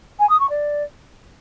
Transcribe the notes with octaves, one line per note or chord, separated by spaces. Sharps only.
G#5
D#6
C#6
D5